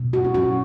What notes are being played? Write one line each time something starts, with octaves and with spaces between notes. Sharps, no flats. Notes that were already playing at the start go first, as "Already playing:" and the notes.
Already playing: B2
F#4
C#4
F#4